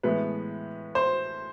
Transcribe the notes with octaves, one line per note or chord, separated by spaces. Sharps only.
A2 E3 G#3 B3 B4
C5